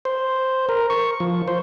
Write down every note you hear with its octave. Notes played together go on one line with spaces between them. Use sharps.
C5
A#4
C#6
F3
C5